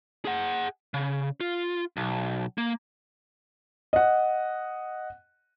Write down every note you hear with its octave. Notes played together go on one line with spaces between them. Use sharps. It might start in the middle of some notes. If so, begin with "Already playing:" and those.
G#4 F#5
C#3
F4
B1
A#3
D#5 F#5